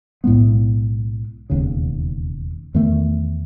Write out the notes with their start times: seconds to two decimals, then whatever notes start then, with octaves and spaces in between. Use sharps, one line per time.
0.24 B1 A2 G#3 B3
1.50 E1 D#2 C#3
2.74 E2 D#3 A3